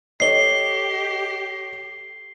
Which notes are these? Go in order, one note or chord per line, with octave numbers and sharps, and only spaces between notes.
G4 A4 C#5 D#5 C7 G7